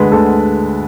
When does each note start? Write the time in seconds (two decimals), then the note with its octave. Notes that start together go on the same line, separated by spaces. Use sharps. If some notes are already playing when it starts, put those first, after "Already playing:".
Already playing: D2 D3 G#3 B4
0.12 D2 A4